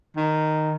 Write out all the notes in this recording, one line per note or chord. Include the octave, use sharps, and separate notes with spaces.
D#3